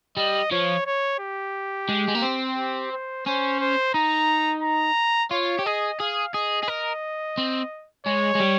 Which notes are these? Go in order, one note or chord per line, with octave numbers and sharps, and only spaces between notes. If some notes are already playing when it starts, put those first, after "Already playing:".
G3 D#5
F3 C#5
C#5
G4
G#3
G#3
A#3
C4
G4
C5
C#4 C5
C5
D#4 A#5
A#5
F4 C#5
G4
G#4 D#5
G#4 F5
G#4 D#5
G#4
A#4
C4
G#3 C#5
G#3
G3